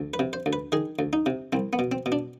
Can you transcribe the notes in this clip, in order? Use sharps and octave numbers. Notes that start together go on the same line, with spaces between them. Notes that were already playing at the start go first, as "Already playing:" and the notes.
Already playing: D2
B4
C3
C5
D2
B4
D#3 G#4
D2
D#4
C3
C2 C4
B3
B2
C4
B2
D4